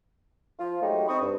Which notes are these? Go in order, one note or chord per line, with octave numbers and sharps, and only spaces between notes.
F3 F4
F#3 G#3 A3 D#4 G4
C4 D#4 B5 C#6 D#6
G2